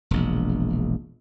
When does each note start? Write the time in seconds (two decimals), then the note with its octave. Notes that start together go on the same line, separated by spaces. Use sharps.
0.11 E1 A#1